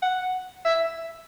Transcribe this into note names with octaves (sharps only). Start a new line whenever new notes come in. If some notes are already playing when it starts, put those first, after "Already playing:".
F#5
E5